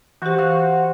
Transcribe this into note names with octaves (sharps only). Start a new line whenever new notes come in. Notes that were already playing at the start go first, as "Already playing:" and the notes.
E3 F#4 G4 C5
F#4 F5